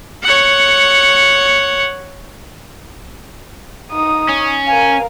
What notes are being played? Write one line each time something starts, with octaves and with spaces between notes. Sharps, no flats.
C#5 F#5
D#4 D#6
C#4
A#4 F5 G#5